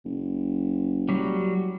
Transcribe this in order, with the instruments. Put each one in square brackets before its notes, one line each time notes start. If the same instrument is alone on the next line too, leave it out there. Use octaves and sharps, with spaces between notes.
[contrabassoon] F#1
[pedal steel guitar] F#3 G3